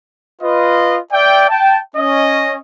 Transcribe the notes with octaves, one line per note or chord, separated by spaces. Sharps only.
F4 B4 D#5
D5 E5 G5
G5 A5
C#4 D#5